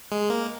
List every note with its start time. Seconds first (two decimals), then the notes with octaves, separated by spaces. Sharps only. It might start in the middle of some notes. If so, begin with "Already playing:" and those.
0.12 G#3
0.30 A#3